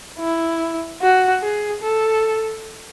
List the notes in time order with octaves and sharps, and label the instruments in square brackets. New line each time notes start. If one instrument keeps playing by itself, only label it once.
[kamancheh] E4
F#4
G#4
A4